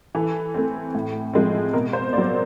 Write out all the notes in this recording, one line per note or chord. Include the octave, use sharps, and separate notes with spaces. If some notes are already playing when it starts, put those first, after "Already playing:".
E3 A4
A3 C4
A2
F3 G#3 C4
B2 A#4
C5
F#3 A#3 D5